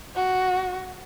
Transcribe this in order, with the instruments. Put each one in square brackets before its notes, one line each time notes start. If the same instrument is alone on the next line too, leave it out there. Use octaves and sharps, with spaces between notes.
[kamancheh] F#4